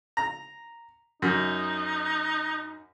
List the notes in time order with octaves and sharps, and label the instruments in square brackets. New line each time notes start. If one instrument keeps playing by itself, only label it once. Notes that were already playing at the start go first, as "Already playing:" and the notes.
[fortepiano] A#5
[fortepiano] F#2 [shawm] D#4